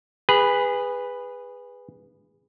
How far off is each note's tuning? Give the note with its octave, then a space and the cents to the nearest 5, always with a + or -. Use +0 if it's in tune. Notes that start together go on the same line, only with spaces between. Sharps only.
G#4 -25 B4 +0